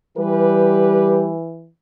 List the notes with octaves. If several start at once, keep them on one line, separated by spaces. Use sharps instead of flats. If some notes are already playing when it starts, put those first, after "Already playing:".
E3 G3 G4 B4